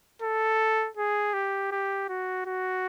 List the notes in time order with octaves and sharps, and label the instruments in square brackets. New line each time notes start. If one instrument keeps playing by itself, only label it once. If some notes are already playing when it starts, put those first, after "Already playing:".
[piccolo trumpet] A4
G#4
G4
G4
F#4
F#4